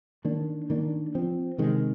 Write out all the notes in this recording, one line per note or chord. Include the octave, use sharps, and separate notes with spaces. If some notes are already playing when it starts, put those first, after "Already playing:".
D#3 A#3 D4
D#3 A#3 D4
F3 C4
C3 D#3 G#3